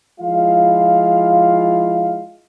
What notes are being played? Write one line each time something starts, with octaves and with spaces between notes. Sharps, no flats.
F3 G#3 E4 F4 F5